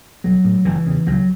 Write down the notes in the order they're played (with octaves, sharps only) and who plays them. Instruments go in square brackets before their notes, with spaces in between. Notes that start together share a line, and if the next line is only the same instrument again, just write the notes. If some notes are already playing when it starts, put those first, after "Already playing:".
[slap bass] B1 F#3
A2
F#1 E3
E2 C#3
C#2 F#3